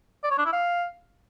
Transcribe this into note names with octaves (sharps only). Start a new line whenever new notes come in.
D5
C#5
D4
E4
F5